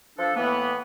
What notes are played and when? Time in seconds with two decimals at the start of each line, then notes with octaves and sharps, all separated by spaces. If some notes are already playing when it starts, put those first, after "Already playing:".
0.18 F3 D4 A4
0.36 A2 E3 A#3 B3